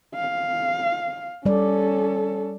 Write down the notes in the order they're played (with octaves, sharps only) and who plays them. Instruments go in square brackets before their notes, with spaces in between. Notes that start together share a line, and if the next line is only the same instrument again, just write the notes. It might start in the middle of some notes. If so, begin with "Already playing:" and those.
[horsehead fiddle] F5
[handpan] G3 D5 [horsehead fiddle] C#4 A4